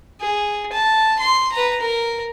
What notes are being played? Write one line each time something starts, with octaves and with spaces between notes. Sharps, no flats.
G#4
A5
C6
B4 A#5
A#4